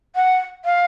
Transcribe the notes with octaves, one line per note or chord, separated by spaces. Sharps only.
F#5
F5